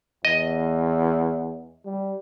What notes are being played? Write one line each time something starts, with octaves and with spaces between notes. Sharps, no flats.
E2 D#5
G3